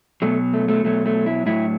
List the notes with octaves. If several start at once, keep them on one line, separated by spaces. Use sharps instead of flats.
B2 F#3 A3
A3
A3
B2 F#3 A3
A3
E4
A2 F#3 E4